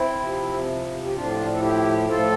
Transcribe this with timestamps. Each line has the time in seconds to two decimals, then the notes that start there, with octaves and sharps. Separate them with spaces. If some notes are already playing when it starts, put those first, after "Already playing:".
Already playing: C4 E4
0.20 C3 F3
1.04 G4
1.13 A2 F3 D4 F4
1.53 A4
1.61 E4 G4
2.08 A2 F3 F4 A4